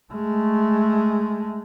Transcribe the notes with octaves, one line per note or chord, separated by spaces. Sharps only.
G#3 A3